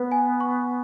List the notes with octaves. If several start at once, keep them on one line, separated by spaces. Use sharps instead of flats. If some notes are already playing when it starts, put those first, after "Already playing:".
Already playing: B3 B4
G#5
C#6